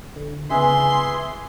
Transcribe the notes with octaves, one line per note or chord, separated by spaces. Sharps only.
D3
C#3 E3 G#3 B3 G#4 E5 C6